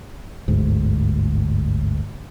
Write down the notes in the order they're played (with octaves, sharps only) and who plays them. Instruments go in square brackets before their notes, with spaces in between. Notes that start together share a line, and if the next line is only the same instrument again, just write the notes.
[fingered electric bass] G1 D2 G#2